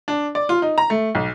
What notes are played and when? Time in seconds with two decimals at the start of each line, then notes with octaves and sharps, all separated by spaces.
0.08 D4
0.35 D5
0.49 F4
0.62 D#4
0.78 A#5
0.90 A3
1.15 B1